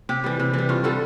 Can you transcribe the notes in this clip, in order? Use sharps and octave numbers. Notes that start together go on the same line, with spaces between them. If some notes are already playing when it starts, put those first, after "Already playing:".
C3 G4
E3 G3
C3
E3
G3
G2 F4
D3 G3 A4